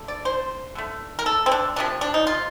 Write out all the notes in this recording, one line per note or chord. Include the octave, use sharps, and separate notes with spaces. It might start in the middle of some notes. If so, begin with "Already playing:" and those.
Already playing: D3 A3
D5
C5
D3 A3
A#4
A4
C4
D4
C3 F3 A#3 D4
D4
D#4
F4